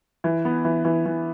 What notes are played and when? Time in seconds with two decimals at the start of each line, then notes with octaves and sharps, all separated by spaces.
0.24 E3
0.45 B3
0.65 E3
0.85 E3
1.06 E3